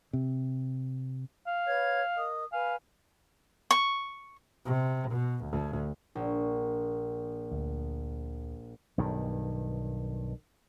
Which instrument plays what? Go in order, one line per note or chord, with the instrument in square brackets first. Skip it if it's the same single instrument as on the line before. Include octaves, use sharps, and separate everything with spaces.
[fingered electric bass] C3
[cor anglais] F5
[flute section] B4 C#5 G#6
A#4 D#5 D#6
[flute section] B4 G#5 [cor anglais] F5
[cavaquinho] C#6
[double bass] C3
B2
D2
[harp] A#1
[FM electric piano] D2
[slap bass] B1 G2 D#3